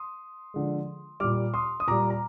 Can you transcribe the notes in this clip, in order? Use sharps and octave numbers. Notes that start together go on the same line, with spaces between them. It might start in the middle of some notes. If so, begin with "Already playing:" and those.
Already playing: C6 D#6
D3 F3 G#3
A#2 G3 D6 F6
C6 D#6
D#6
A#2 G3 A#5 D6
A#5